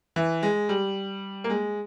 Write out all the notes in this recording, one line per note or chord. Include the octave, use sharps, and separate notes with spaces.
E3
G#3
G3
A#3
G#3